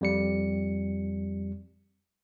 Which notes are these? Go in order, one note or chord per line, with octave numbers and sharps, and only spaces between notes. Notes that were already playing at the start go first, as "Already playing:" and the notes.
F2 G3 C#7